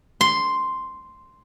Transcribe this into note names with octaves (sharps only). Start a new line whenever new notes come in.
C6